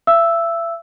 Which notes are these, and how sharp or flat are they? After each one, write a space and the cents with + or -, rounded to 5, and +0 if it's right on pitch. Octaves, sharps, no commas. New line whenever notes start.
E5 +35 E6 +0